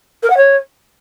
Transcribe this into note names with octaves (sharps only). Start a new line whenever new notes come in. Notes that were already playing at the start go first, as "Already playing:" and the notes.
A#4
F#5
C#5